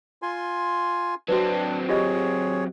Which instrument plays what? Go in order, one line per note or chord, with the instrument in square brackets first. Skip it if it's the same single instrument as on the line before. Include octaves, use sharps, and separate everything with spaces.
[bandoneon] F4 G#5 C6
[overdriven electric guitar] F#3 C4 [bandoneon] D4 [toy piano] F#4 B4
[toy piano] F4 G4 D#5 [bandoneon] G#4 C#5